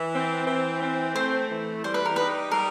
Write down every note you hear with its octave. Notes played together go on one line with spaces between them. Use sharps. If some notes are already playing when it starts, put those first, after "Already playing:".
Already playing: E3
C4
E3
C4
A3 C5
E3
G3 C5
B4
A#4
D#4 B4
G3 A#4